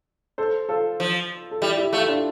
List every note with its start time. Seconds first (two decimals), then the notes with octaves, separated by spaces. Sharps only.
0.38 A4 C5
0.69 F4 A4
1.00 F3
1.51 A4
1.62 G3 E4 G4
1.77 E4 G4
1.93 A3 F4 A4
2.08 D4 F4